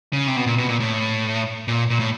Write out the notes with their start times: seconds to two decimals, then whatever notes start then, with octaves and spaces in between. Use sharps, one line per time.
0.13 C#3
0.27 C3
0.36 B2
0.46 A#2
0.58 B2
0.69 A#2
0.80 A2
1.68 A#2
1.90 A#2
2.00 A2